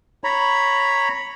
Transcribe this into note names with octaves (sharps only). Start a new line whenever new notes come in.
C#5 A#5 B5